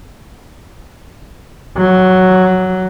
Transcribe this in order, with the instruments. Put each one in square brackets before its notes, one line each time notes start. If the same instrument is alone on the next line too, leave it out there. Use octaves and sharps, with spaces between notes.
[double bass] F#3